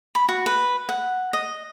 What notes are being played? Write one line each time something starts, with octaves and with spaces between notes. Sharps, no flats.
B5
F#4
B4
F#5
D#5